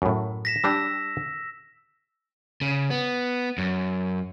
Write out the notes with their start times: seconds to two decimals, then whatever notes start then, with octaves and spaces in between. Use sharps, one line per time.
0.02 F#2 A2
0.45 A#6 B6 E7
0.64 G3 D4 G4 E6
2.61 C#3
2.90 B3
3.58 F#2